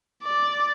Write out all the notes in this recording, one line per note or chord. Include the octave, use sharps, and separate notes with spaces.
D5